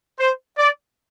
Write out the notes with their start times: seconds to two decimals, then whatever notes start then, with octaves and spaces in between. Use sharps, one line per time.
0.18 C5
0.58 D5